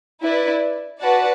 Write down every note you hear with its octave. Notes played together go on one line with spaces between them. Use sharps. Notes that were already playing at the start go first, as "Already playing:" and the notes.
E4 B4 D5
F#4 B4 D5 F#5 A5